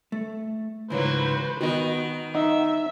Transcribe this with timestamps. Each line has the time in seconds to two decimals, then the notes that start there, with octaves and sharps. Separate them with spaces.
0.12 A3
0.90 C#2 G#2 E3 F#3 A#3 B4 C5
1.61 D#3 B3 F#4 D#5
2.35 D#4 E5 F#5